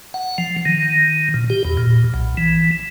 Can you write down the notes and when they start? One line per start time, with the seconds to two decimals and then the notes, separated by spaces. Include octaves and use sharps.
0.14 F#5
0.38 F3
0.65 D#3
1.34 A#2
1.50 G4
1.65 E2
1.77 A#2
2.14 B1
2.37 E3